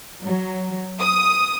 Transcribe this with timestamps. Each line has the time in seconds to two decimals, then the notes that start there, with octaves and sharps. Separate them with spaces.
0.24 F#3
1.00 D#6